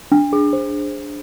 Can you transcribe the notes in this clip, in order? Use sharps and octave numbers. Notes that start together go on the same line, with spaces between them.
D4
G#4
C5